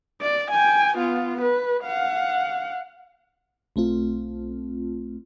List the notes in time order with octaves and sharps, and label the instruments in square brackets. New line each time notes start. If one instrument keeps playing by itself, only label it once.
[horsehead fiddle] D5
G5 G#5
B3 F4
B4
F5 F#5
[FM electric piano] B1 A3 C4 F4